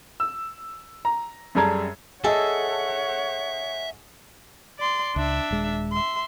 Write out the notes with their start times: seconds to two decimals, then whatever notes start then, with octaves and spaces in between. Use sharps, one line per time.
0.20 E6
1.05 A#5
1.55 F#2 G3 G#4 A4 A#5 G#6
2.24 G#4 A4 C#5 D#5 E5 F#5
4.79 D5 C6
5.16 C#2 D4 E5
5.51 D#1 G#3
5.93 E5 C6